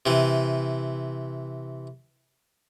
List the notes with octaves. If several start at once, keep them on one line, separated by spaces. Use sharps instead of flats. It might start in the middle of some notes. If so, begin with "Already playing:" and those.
C3 E3